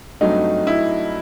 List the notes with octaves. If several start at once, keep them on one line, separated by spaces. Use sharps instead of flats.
G2 F#3 A3 C4 D#4
E4